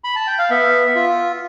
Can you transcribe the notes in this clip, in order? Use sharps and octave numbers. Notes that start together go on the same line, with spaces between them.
B5
A5
G5
F5
B3 E5
F4